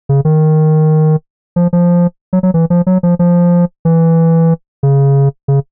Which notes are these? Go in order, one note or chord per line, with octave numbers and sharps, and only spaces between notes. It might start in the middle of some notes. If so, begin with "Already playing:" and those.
C#3
D#3
F3
F3
F#3
F#3
E3
F3
F#3
F3
F3
E3
C#3
C#3